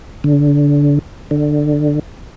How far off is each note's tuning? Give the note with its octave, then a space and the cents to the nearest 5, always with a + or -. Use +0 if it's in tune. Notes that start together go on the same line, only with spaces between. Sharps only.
D3 -25
D3 +15